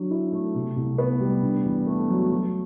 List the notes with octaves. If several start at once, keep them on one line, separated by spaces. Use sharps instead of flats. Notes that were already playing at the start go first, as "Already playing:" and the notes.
Already playing: D3 F#3
E4
A3
C3
C2
B3
G3
D3
E2
A3
F#3
F#3